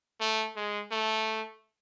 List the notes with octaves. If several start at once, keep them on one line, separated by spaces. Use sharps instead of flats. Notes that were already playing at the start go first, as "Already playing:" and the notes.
A3
G#3
A3